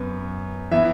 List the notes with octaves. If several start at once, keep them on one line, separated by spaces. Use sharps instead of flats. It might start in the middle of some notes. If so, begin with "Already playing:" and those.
Already playing: F#2 B3
E3 B3 E4 E5